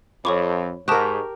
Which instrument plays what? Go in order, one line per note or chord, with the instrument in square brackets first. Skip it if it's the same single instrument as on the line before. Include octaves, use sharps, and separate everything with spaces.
[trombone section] F2 [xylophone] C#5 C#6 D6 [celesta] B5
[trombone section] G#2 [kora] G4 A#4 [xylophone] A5 D#6 F#6 [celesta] C#6